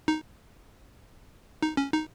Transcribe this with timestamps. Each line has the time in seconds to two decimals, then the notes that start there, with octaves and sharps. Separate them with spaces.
0.08 D#4
1.62 D#4
1.77 C#4
1.93 D#4